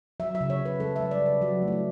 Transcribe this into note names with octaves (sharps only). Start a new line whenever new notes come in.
F#3 E5
E5
C#3
C#5
C#3
B4
G3 A4
G3 E5
D5
C#3 B4
F#3 F#4
A3
E4
F#4